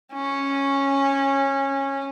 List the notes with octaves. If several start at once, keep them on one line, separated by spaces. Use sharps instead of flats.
C#4